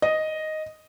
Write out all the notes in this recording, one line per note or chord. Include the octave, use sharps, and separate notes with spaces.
D#5